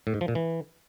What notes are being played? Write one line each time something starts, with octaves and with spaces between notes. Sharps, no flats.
A2
G#2
F3
A#2
E3